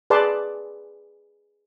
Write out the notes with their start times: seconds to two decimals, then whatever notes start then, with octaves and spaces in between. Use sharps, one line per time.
0.10 G#4 B4 D5 A5 C6